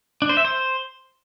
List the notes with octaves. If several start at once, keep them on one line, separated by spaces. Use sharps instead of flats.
D4
C5
E5
C5